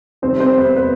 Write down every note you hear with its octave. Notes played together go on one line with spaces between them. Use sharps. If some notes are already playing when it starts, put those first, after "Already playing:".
F2 C3 D#3 G3 C4 C5
C4 C5
B3 B4
B3 B4